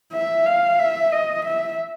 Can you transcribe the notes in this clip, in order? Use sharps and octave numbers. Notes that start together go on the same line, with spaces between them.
E5
F5
E5
D#5
E5